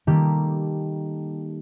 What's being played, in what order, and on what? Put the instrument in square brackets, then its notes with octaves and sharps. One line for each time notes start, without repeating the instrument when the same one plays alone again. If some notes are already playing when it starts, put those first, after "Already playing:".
[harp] D#3 G3 A#3 D#4 G4 A4